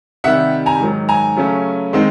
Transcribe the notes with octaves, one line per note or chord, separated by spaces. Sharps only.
C3 D#3 G3 E5 F#5
G#5 A#5
G#2 D#3 F#3
G#5 A#5
C#3 F#3 A3 C#4
D#3 G#3 C4 D#4